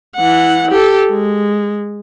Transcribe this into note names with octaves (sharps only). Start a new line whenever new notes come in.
E3 F#5
G4 A4
G#3